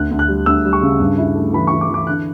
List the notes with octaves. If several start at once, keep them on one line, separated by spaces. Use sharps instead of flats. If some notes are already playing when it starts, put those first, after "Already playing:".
Already playing: D2 F#6
D2
F#6
G3
D2 E6
G3
C#6
C#3
G2
E4
A3
E3 B5
C#6
E3
D6
E3
D6
D3 F#6